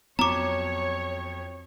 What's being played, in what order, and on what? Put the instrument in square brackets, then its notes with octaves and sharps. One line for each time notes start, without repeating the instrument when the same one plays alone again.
[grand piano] F2 F#3 [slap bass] B3 [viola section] C#5 [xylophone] A#5 D6